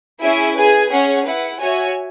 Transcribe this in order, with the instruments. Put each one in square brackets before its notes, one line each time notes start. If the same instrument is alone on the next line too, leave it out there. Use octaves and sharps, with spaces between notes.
[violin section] C#4 E4 G#4 E5 G#5
G#4 B4 G#5
C#4 G#4 C#5 F#5
E4 B4 F#5
F#4 C#5 E5 G#5